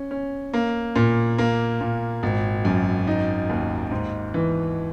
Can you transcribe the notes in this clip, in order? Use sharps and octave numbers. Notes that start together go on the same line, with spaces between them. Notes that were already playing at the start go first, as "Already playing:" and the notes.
Already playing: C#4
C#4
A#3
A#2
A#3
A#2
G#1
F#2
D#4
D#2
G#2
E3